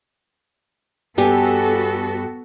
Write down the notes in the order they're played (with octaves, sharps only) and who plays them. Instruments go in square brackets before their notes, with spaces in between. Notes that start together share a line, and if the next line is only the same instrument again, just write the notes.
[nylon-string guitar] G2 G4 G#5 [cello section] B3 F#4 A4